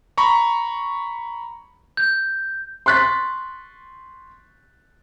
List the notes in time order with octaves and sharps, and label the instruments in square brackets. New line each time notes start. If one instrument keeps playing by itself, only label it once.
[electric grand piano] A#5 B5 C#6
[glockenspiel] G6
[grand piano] C6 C#6 F#6 A6 B6